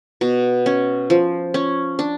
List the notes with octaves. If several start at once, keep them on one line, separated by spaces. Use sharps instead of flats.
B2
C#4
F3
C#4
D4